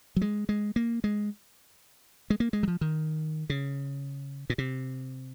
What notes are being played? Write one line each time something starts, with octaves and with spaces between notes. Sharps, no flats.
F#3
G#3
G#3
A#3
G#3
G#3
A#3
G#3
F#3
F3
D#3
C#3
A#2
C3